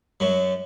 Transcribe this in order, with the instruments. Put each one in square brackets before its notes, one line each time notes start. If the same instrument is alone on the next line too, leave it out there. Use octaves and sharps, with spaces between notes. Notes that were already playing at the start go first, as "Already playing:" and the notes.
[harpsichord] F#2 F#3